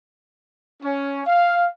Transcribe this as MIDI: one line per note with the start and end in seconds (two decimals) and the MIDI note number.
0.83 1.22 61
1.26 1.68 77